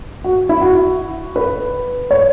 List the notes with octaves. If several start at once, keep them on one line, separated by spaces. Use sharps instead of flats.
F#4
E4
F#4
B4
C#5